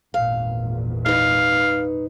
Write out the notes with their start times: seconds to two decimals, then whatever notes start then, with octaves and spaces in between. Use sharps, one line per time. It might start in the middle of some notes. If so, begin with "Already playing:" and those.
0.14 G#1 E2 A#2 F5
1.06 D#4 B4 F5